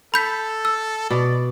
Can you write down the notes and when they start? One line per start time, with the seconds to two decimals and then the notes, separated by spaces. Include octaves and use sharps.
0.14 A4 B5 G6 B6
0.65 E6
1.10 B2 D5